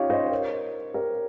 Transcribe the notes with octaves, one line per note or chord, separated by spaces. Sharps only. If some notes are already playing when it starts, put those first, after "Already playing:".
Already playing: C#4 D#4 F4 G4 C#5 F5
C5 D#5
A#4 C#5
G4 A#4